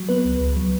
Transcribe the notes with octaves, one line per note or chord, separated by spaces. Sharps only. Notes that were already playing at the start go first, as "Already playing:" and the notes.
Already playing: F#3
B3 B4
C#2
C#2
F#3